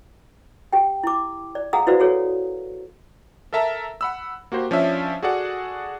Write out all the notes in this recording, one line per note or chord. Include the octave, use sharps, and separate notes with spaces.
G4 G5
E4 D6
D5
G#4 F5 F#5 A#5 D#6
E4 F#4 B4 C5 D5 F5
F#4 G#4 A4 C#5
A4 A#4 E5 A5 A#5
F#5 B5 E6
A#3 F#4 G4 C5
F3 C#4 D4 E5
F#4 G#4 A4 D5 F#5